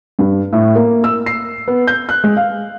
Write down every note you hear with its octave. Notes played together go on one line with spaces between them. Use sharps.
G2
A2
A#3
E6
C7
B3
G6
F#6
G#3
F5